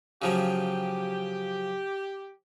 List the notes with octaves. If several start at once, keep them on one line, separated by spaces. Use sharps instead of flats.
C#3 F3 F#3 G4